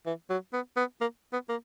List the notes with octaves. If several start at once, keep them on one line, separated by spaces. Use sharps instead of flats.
E3
F#3
B3
B3
A#3
B3
A#3